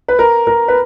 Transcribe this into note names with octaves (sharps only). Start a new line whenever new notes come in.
B4
A#4
A#4
B4